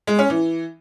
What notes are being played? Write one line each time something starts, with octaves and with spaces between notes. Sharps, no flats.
G#3
C#4
E3